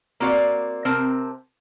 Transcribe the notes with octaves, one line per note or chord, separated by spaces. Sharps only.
A#3 C4 F#4 D5
C3 C4 A#4 C5 A5